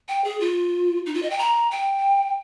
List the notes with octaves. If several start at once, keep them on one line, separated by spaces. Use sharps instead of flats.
G5
G#4
F4
D#4
F4
D#5
G5
A#5
G5